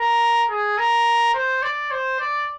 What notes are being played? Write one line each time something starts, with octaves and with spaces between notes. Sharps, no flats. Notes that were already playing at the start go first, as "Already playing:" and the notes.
Already playing: A#4
G#4
A#4
C5
D5
C5
D5